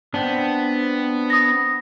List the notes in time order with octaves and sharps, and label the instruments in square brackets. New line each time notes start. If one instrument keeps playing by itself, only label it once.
[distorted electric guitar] B3 [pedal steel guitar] C4 D4
[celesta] D#6 A#6